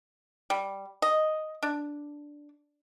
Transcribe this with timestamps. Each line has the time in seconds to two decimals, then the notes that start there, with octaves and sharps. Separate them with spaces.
0.50 G3
1.02 D#5
1.63 D4